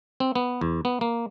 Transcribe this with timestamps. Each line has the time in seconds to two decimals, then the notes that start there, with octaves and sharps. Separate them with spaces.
0.20 C4
0.35 B3
0.61 E2
0.85 B3
1.01 A#3